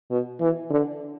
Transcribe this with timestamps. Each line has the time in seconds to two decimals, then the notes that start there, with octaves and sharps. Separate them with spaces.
0.11 B2
0.40 E3
0.70 D3